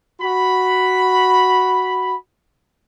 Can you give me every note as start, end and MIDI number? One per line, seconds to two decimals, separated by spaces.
0.21 2.15 66
0.21 2.15 83